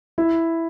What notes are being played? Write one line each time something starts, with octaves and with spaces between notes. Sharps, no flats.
E4